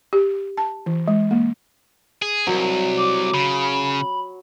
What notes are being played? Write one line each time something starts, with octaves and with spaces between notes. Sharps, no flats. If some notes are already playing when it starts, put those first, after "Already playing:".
G4
A5
E3
G#3
A#3
G#4
C2 F#3
D6
C#3 B5